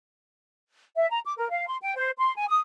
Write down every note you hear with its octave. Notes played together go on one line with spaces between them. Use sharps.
E5
A#5
D6
A#4
F5
C6
G5
C5
C6
G#5
D#6